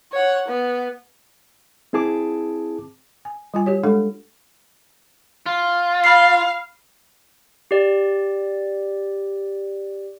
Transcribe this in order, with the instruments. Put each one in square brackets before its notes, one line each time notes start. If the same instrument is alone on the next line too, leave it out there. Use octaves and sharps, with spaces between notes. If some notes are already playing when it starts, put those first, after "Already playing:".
[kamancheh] C#5 F#5
B3
[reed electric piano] C4 E4 G#4 A5 D6
[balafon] G#5
G3 F4 G#5
F#4 G4 C#5
G#3 D4 A4 F#5
[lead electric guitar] F4
[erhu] F5 [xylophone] B5 F6 C7
[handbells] G4 D5